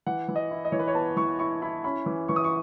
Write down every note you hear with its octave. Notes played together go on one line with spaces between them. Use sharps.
E3 F#5
E3
D#5
E4
D#5
E3 C#5
B4
C#5
B3 A5
E3 C#6
E4 C#6
E4 B5
C#4 B5
E3
E3 C#6
D#6
C#6